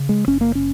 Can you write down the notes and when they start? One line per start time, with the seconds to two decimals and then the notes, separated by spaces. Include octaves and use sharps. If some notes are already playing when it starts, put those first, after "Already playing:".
Already playing: C#3
0.09 G#3
0.28 F#1 C#4
0.41 A#3
0.55 C#4